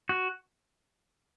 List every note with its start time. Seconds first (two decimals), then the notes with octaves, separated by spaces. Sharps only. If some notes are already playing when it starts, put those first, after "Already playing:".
0.09 F#4